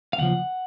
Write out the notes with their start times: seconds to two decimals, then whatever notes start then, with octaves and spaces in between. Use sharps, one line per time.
0.13 F5
0.18 D#2 C#3 F3 F#5